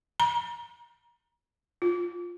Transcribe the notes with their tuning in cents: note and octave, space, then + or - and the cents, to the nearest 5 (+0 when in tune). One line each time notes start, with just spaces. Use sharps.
A#5 +45
F4 +5